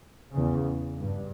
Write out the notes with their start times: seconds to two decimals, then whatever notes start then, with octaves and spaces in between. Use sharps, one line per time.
0.32 E2 C#3
1.00 G2